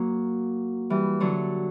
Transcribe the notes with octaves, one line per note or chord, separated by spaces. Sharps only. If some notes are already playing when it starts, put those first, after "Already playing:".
Already playing: F#3 A#3
E3 G3
D3 F#3